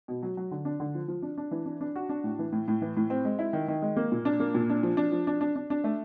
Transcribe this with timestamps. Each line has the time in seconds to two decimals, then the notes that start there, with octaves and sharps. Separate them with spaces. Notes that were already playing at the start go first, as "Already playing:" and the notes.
0.08 B2
0.23 F#3
0.37 F#3
0.51 D3
0.65 D4
0.80 D3
0.95 F3
1.08 F3
1.22 D4
1.38 D4
1.51 E3
1.66 D4
1.81 D4
1.96 F#4
2.09 D4
2.24 A2
2.39 E3
2.52 A2
2.68 A2
2.82 E3
2.97 A2
3.10 C4
3.25 G#3
3.39 E4
3.53 D#3
3.68 D#3
3.82 G#3
3.97 A#3
4.12 A#2
4.25 D4
4.40 A#3
4.54 A#2
4.70 D4
4.83 F3
4.97 D4
5.12 F3
5.27 D4
5.41 D4
5.56 D4
5.70 D4
5.84 A3